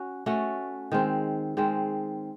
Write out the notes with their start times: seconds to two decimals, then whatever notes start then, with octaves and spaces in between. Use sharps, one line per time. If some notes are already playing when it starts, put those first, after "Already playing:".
Already playing: C#4 F#4
0.26 A3 C#4 F#4
0.92 D#3 G#3 C4
1.57 D#3 G#3 C4